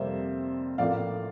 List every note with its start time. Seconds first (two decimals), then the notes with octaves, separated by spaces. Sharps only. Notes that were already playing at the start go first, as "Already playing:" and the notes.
Already playing: F2 C3 G3 A#3 C5 E5
0.78 A1 A2 F3 A#3 D5 F5